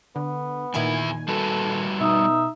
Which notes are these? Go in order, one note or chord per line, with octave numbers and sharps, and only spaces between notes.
D3 B3
E2 A#2 D#3 E4 E5 G#5
G3 F#4 A4 B4
B2 D#4 E5